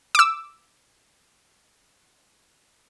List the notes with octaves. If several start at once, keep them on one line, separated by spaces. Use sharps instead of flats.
D6 E6